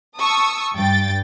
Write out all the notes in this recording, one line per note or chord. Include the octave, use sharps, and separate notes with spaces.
A5 C#6 D#6 E6
G2 G5 A6